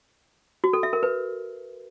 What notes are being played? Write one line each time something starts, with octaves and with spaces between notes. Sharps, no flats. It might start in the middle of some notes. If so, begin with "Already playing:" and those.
F#4
A4
E5
A#4
B4